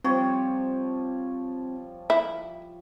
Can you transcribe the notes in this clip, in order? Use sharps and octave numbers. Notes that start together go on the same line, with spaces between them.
F3 G3 C4 C#5
E4